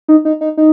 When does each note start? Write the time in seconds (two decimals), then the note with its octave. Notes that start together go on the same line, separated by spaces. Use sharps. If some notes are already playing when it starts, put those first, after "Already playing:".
0.08 D#4
0.25 D#4
0.41 D#4
0.57 D#4